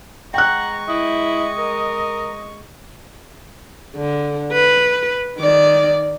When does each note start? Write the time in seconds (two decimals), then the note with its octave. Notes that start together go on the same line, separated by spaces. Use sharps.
0.34 G#3 F#5 G5 A#5 C#6 F#6
0.89 E4 D#5
1.58 A#4
3.96 D3
4.52 B4
5.38 D#3 D5